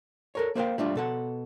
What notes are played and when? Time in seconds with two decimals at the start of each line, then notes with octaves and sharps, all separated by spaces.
0.35 A4 A#4 C#5
0.55 A#3 A#4 C5 C#5 F5 G5
0.78 G3 A3 D4 F4
0.95 B2 A4 F#5